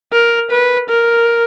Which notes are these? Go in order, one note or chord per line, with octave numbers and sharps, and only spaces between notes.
A#4
B4
A#4